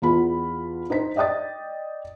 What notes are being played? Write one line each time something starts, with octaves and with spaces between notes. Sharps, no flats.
E2 B3 F4 B5
D#4 C5 B6
D5 D#5 G5 D#6 A6